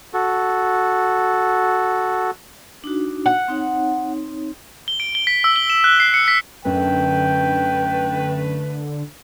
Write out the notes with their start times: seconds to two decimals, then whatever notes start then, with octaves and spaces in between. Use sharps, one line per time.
0.14 F#4 A4
2.84 D4 D#4 F#4
3.26 F#5
3.48 C4 D#4 C#5
4.88 G7
5.00 D7
5.15 G7
5.27 B6
5.44 E6
5.56 G7
5.70 E7
5.84 F#6
6.00 C7
6.14 C#7
6.28 B6
6.65 F#2 D3 A3 B4 G5